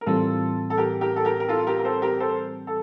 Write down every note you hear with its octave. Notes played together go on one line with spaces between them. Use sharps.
A#4
A2 E3 G3 C4 F4 A4
A4
G4 A#4
G4 A#4
A4
G4 A#4
A#4
F4 A4
G4 A#4
A#4
A4 C5
G4 A#4
A4 C5
A4